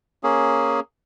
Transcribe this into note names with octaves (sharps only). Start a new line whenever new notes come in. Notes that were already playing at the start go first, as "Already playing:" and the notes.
A#3 C#4 G#4